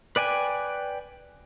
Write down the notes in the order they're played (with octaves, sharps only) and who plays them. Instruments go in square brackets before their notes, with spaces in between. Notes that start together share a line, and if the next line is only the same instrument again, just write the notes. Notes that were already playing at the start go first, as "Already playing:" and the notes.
[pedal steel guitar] B4 D5 G5 G#5